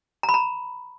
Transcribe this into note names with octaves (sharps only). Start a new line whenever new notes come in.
A#5
B5
A#5